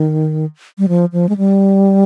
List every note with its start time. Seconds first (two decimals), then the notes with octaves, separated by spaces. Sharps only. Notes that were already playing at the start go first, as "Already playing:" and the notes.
Already playing: D#3
0.78 G3
0.88 F3
1.13 F3
1.29 G#3
1.38 G3